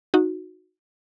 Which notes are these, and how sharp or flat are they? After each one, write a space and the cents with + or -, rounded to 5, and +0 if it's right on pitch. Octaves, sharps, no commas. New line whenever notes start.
D#4 +0 F#4 -15